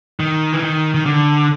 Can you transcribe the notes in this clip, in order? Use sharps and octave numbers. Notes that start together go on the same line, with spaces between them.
D#3
E3
D#3
D#3
D3